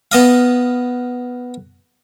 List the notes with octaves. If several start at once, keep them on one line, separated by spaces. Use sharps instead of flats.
B3 D#5 F5